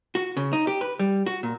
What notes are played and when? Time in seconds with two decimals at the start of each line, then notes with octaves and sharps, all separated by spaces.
0.15 F#4
0.37 C#3
0.53 D#4
0.67 G4
0.81 B4
0.99 G3
1.26 F#4
1.43 A#2